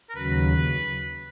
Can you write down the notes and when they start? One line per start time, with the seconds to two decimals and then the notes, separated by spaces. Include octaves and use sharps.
0.10 A#4
0.16 D#2 C#3 F#3 B4